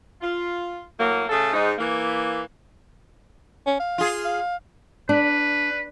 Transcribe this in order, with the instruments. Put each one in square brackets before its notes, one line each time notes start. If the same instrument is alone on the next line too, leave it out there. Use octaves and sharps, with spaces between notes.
[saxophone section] F4
A2 F#3 A#3
C#3 A3 G#4 A4
G#2 D#4
E3 A#3
[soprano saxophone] C#4
F5
[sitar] F4 G#4
[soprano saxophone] F5
[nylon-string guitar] D4 [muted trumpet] B4